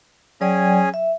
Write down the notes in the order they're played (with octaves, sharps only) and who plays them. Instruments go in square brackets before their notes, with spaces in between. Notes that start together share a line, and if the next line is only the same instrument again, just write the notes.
[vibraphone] F#3 D5 G5 [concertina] C#4 G#4
[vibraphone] E5